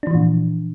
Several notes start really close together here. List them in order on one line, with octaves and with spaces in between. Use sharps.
D4 E3 F3 A#2